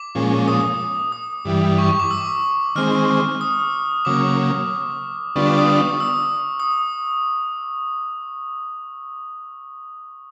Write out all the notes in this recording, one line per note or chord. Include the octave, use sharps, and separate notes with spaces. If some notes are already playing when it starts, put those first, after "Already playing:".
Already playing: D6
A#2 F3 G#3 C#4
D#6
D#6
G2 E3 G3
C#6
C#6
D6
E6
D#3 G#3 C4 F6
D#6
C#3 F#3 A#3 D6
D3 G3 B3 D4 F4 C#6
D6
D#6
E6
D#6